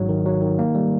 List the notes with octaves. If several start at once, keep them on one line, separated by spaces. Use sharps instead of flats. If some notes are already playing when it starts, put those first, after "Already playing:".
Already playing: G#1 G#2 F#3
D#3
F#3
D#3
A#3
G3